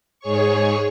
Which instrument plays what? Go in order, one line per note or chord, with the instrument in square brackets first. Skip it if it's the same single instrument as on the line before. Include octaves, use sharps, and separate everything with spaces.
[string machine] G#2 G#4 C#5 C#6